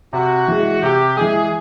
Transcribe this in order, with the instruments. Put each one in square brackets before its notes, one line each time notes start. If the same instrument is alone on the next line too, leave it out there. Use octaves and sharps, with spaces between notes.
[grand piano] C3 [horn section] F#4
[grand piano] E3 G#3
[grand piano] C3 [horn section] G4
[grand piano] E3 G#3 [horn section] G#4